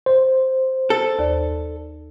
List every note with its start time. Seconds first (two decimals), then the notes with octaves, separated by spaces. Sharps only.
0.06 C5
0.90 A4
1.19 D#2 D5